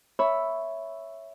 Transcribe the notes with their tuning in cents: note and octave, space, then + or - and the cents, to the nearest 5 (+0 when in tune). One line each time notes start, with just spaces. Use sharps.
C#5 +0 E5 +0 B5 +0